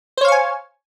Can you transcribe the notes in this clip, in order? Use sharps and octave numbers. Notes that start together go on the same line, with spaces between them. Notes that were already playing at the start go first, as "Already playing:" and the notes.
C5 C#5 F5 G#5 C#6